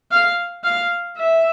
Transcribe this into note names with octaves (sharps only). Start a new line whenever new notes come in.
F5
F5
E5